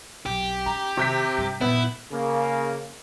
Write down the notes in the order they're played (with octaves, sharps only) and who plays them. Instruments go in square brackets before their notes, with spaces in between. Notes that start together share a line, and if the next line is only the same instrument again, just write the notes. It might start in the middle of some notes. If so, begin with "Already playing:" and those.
[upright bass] B1 C4 [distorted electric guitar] G4
[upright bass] C#4 [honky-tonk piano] A#5
[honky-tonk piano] C3 G6 B6 [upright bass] D#3
[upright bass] G2 G3
[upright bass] F#2 A#2 [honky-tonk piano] B3 [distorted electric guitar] E4
[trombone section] C#3 A#3